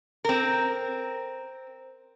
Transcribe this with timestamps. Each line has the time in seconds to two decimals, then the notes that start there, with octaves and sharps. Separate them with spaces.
0.25 C4 A#4